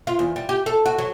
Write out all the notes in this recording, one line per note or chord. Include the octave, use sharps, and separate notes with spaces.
F4
E2
G3
G4
A4
F#4
F#3